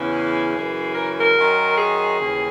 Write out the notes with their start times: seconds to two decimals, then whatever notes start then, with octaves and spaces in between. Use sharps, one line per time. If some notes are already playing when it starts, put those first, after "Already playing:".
Already playing: E2 C#3 E3
0.11 G#4
0.53 F#2 C#3 E3
0.94 A#4
1.20 A#4
1.36 F#2 D#3
1.78 G#4
2.19 D#2 C#3 E3